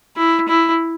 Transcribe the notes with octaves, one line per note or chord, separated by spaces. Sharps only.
E4
E4